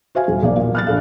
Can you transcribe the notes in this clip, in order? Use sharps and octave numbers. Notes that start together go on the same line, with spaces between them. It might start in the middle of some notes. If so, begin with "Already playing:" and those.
F#4 C5 E5 F5 G#5
D#1
B1 A#3 D5
A#2
F6 F#6 A6
A#1 A4 F5